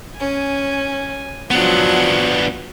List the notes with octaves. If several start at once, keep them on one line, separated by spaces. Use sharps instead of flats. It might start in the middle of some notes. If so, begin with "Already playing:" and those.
C#4 G#5
F3 F#3 B3 D4 F#5